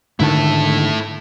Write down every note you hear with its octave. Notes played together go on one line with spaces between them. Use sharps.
G#2 D3 D#3 E4 A4